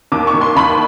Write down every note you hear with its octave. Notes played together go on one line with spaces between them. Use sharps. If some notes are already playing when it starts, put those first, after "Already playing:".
D#2 D6
C#6
D#2
C6
D#2 B5